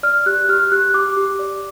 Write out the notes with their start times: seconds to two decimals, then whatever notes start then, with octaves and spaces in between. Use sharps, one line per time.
0.03 D5 F6
0.26 G4 F#6
0.49 G4 F6
0.72 G4 F#6
0.94 G4 D6
1.17 G4
1.39 D5